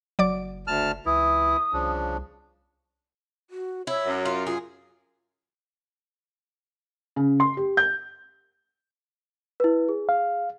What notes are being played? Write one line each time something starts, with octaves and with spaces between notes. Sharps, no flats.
F#1 F#3 D5 D6
D2 A5 F6
C#2 E3 E4 D#6
C2 C#3 F3 D4
F#4
E4 C#5
F#2
F4
F4 G#4
C#3
C6
G4
G6
E4 B4
G#4
F5